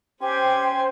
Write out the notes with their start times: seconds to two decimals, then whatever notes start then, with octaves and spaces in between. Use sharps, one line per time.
0.21 C#4 G4 C5 G5 G#5 C6